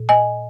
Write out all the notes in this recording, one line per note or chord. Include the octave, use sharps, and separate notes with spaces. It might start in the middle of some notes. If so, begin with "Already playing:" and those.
Already playing: A#2
D#5 G#5